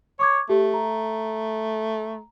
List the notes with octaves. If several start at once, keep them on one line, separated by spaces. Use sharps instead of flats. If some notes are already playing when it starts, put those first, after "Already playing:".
C#5 C#6 D6 G#6
A3 G4
A#5